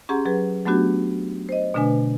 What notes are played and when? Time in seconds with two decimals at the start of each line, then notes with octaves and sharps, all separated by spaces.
0.09 C#4 G4 G#4 F#5 A#5 C6
0.25 F#3 G#4 B4
0.65 F#3 A3 B3 D4 F#4 G4
1.49 C5 D#5
1.74 B2 D3 A3 D4 B4 G#5